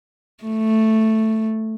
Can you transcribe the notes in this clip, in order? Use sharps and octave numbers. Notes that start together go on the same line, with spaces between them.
A3